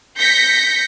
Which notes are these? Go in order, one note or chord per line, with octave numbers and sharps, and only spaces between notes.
G6 A#6 B6 C#7